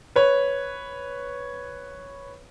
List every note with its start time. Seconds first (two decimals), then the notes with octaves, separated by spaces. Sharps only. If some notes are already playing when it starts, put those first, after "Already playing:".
0.16 B4 C#5